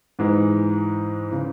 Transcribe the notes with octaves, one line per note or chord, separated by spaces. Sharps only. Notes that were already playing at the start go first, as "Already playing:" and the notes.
G#2 E3 G#3
C#3 E3